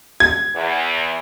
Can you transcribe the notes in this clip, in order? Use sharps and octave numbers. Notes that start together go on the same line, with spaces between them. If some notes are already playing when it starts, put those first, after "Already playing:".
G#6
E2